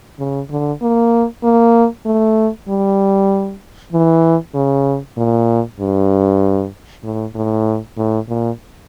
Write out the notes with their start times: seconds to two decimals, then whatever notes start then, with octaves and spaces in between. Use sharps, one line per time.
0.19 C#3
0.50 D3
0.82 A#3
1.43 A#3
2.06 A3
2.69 G3
3.93 E3
4.54 C#3
5.18 A#2
5.80 G2
7.04 A2
7.35 A2
7.97 A2
8.29 A#2